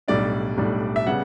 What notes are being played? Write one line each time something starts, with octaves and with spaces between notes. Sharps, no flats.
B1 A2 G3 D4 D5
B1 A2 G3 D4
E5
C#3 G3 B3 F#5